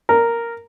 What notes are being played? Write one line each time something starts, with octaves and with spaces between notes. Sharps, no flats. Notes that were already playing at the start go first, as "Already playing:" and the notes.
A#4